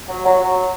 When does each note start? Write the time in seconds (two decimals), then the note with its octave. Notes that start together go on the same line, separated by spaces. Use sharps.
0.09 F#3
0.24 F#3
0.39 F#3